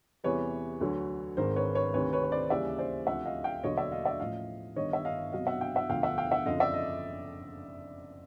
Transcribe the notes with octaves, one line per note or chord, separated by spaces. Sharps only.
E2 C3 E3 G3 B4 C#5
D2 D3 F#3
G#1 G#2 D#3 A#4 C5
B4 C#5
B4 C#5
D2 C3 D#3 B4 C#5
B4 C#5
C#5
C5 D5
D#2 C#3 E3 G3 D5 E5
C5 D5
D2 C3 F3 E5 F#5
D#5 F5
F5 G5
E1 D#2 D3 F#3 C#5 D#5
D5 E5
D#5 F5
D5 E5
A1 A2 F3 D#5 F5
G1 G2 D#3 G3 C#5 D#5
E5
D#5 F5
C2 B2 F#3 D#5 F5
E5 F#5
F5 G5
E5 F#5
E1 D2 D3 F3 F5 G5
E5 F#5
F5 G5
E5 F#5
F#1 F2 D3 F3 D#5 F5
D5 E5
D#5